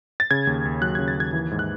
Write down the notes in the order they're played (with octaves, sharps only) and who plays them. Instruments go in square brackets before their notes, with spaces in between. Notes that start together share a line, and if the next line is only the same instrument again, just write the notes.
[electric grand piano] A6
C#3 G#6
D#2
D#2
F#3 F#6
C#3 G#6
A6
D#2 G#6
E3
G#2
F#6